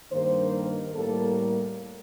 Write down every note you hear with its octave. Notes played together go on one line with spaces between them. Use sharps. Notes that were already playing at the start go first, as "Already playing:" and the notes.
G2 D#3 A#3 C5
A#4
A2 G3 A#3 A4